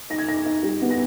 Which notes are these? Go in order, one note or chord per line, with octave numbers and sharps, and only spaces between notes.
D#4 A#6
G#6
D#4 A#6
D#4
G3
B3
A#6